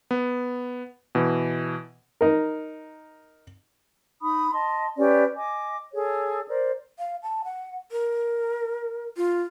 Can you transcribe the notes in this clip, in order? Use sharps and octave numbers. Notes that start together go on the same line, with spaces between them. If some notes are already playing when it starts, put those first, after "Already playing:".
B3
B2 E3
D#4 A#4
D#4 B5 D#6
D#5 A5 C6
C#4 G4 B4 D5
D#5 G#5 D6
G#4 A4 C#5
A#4 C5 D5
F5
A5
F#5
A#4
F4